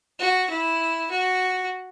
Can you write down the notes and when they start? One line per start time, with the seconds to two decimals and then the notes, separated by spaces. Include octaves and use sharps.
0.19 F#4
0.50 E4
1.10 F#4